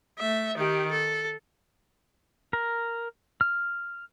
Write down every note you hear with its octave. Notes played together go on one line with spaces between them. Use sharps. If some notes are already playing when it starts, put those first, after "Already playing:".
A3 E5
D#3 G4
A4
A#4
F6